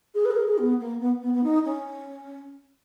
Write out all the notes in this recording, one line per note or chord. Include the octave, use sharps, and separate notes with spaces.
G#4
B4
G#4
A#4
G#4
B3
A#3
B3
B3
B3
D#4
C#4